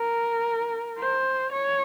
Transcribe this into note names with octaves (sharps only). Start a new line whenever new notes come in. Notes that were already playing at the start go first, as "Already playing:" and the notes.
Already playing: A#4
C5
C#5